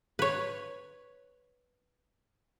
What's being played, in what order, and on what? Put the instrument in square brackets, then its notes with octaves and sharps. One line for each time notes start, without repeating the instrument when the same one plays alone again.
[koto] B4 C#5